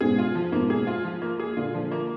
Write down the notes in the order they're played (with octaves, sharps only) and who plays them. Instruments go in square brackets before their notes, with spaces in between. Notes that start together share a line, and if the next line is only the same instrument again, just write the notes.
[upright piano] G#2 B2 [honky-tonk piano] G#4
[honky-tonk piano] F4
F3
[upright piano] G#2 B2 [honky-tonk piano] A#3
[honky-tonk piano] G#4
F4
F3
A#3
G#4
[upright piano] A#2 D3 [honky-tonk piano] F4
[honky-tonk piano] F3
A#3